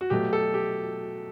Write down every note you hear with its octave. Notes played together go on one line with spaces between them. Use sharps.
F#4
B2 F#3 A3 G4
A4
G4